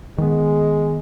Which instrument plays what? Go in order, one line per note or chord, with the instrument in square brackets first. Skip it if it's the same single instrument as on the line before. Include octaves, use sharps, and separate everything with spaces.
[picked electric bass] D#3 B3 [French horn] G#3